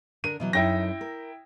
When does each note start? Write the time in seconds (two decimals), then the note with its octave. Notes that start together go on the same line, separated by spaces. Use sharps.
0.24 D3 D4 A#4 D#7
0.40 B2 E3 F#3
0.53 F#2 D#4 E4 A4 G5 A#6
1.01 A#4